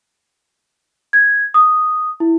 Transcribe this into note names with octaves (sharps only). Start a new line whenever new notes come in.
G#6
D#6
E4